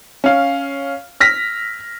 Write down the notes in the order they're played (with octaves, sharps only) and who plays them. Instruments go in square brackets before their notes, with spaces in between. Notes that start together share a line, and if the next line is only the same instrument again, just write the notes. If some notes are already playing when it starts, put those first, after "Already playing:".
[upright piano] C#4 F5
F6 A#6 B6